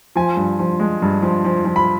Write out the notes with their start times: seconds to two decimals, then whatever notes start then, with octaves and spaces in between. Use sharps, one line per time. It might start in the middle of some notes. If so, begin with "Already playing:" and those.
0.16 F3 G#5
0.37 G2
0.59 F3
0.80 G#3
1.02 G2
1.22 F3
1.45 F3
1.65 F3
1.76 B5